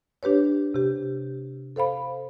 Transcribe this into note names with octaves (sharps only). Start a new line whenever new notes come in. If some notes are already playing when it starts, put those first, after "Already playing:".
D4 G4 B4 C#5
C3 G4
A4 C5 F5 B5